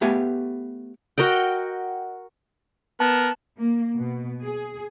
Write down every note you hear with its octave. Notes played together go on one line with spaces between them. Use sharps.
A3 B3 G4 F5 G#5
F#4 A#4 D#5 G5
B3 A#4 A5
A#3
B2
G#4